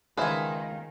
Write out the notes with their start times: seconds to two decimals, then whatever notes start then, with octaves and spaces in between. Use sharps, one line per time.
0.17 C#2 D#3 G#4 B4 C5 E5 F5 G#5